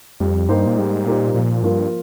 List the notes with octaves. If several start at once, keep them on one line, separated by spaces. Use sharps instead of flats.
F2 G3
G2 A#3 D#4 G4 C5
A#2
G#2 G3
A#2 A#3 D#4 G4 C5
A#2 F3
G2 A#3 F4 A#4